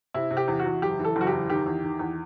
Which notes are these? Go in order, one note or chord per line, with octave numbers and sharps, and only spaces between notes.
C3 E4
C3
G4
E2
F#4
E2
F#1 G4
E3
A4
F#1 F#4
G4
E2
D#3 G4
E2
D#3
E2